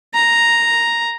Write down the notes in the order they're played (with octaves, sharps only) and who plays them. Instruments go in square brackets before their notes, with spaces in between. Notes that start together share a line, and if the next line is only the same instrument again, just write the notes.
[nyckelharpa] A#5